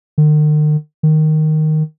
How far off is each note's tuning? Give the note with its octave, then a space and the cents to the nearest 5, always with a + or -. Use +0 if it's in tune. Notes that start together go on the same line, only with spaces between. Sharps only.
D#3 -45
D#3 -5